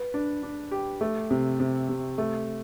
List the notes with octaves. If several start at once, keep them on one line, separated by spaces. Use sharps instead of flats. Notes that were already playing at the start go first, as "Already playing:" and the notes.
Already playing: B4
D4
D4
G4
A3
C3
C3
C3
A3